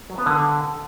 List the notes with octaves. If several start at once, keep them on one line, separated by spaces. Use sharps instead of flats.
F#3
B3
D3